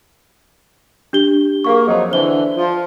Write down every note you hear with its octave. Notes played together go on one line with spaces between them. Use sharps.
D4 G4 G7
A#3 G#4 F5 C#6
F2 F#3 D#4
D3 E3 C5 G7
F3